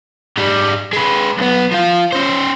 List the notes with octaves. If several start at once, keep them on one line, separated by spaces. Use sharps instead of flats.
G#2 G3
G#3 B4
B1 B3
F3 F4
C#4 C5